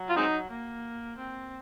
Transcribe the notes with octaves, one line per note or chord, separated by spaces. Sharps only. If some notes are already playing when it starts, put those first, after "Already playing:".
Already playing: F#3
F4
G#3 C4 D#4
A#3
C4